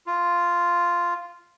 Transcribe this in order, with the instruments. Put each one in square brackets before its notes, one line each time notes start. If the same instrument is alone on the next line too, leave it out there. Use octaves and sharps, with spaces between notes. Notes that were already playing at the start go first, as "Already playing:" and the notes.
[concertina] F4